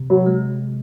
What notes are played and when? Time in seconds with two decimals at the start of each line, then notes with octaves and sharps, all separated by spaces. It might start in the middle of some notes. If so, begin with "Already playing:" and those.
Already playing: C3
0.10 F#3
0.26 G#3